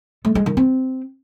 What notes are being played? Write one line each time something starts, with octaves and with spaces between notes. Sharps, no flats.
A3
G#3
D#3
C4